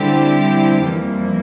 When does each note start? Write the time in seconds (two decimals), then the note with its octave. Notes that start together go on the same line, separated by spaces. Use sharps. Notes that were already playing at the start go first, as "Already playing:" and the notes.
Already playing: D3 G3 C4 E4 G4
0.81 F2 E3 G3 A#3